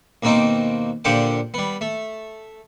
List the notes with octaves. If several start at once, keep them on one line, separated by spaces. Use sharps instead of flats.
D#2 B2 A#3 C4 D#4 D6
A#2 D3 G4 C5 F#5 D6
G3 B3
A3